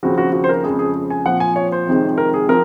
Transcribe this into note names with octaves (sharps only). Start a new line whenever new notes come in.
D#2 C#3 F3 C4 F#4
F#4
F#4
C5
A#4
F2 C#3 G#3 G#4
G#4
G#5
A#2 F3 C4 F#5
G#5
C#5
C5
F2 C3 D#3 G#3
A#4
G#4
F3 C4 A#4